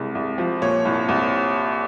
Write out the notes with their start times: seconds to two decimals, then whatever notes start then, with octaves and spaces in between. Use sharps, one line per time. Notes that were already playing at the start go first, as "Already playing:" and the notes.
Already playing: C2 C3 G#3
0.15 C2
0.38 F3
0.62 A#2 C#5
0.85 C2
1.08 C2